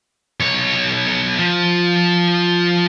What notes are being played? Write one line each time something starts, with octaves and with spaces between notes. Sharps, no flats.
B1 C#5
F3